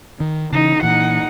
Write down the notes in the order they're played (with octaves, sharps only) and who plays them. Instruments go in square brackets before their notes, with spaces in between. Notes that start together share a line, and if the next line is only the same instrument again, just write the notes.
[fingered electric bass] D#3
[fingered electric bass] C#3 E3 [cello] D#4
[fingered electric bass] A#2 E3 [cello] D#4 F#5